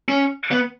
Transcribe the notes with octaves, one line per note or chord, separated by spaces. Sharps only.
C#4
B3